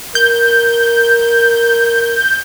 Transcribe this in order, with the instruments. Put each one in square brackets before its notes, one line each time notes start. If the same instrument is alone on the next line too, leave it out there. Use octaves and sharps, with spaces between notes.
[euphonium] A#4 [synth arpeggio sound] G6